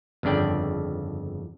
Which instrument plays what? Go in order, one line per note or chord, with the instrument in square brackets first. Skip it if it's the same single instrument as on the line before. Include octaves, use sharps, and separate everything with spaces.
[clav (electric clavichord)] G1 F2 C#3 D4 D5 G5